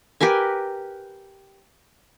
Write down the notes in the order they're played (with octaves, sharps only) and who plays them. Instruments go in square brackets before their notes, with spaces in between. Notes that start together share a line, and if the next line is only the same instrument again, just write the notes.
[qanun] G4 A#4 B4 G#5